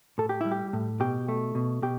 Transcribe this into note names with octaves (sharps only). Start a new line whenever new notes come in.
A2 A4
G4
G3 E4
G4
A2
B2 G4
A3
B2
B2 G4